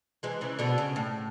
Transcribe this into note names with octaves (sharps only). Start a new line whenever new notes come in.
E3 G#3
C#3 E3
B2 D3
C#3
A2